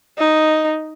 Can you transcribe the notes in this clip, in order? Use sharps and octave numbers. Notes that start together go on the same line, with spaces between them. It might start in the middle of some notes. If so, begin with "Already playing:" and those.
D#4